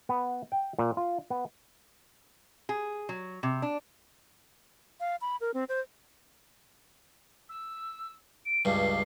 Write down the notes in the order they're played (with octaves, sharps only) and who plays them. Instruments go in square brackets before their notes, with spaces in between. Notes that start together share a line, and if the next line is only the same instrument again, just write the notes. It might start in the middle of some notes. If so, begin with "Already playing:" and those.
[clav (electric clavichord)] B3
G5
A#2
F4
B3
[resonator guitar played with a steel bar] G#4
F#3
C3
D4
[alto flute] F5
B5
A#4
C4
C5
[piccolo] E6
D7
[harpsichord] C#2 G2 [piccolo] C7